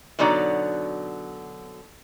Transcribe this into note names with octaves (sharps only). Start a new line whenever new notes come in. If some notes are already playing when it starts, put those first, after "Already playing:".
B2 D3 F#3 D#4 D5